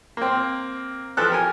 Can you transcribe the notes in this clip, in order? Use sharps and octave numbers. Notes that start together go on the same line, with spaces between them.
A#3 C4
E3 F3 A4 F#6
G4 A#4 G#5